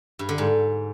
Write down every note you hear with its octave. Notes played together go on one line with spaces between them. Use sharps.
G2
D3
G#2